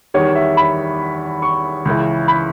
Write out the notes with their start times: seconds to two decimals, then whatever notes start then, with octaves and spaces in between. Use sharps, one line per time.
0.14 E2 D#3 G3 C#5
0.35 E5
0.57 B5
1.42 C#6
1.85 C#2 C#3 E3
2.28 B5